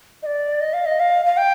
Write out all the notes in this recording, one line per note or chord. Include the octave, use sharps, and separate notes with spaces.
D#5
D5
D#5
F5
D#5
F5
F5
G5